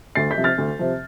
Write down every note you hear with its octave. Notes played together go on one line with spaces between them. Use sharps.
D2 A6 C7
G6 B6
C3 F3
F6 A6
D2
C3 F3